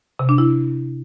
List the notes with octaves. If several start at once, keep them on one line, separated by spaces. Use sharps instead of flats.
C3
D4
E4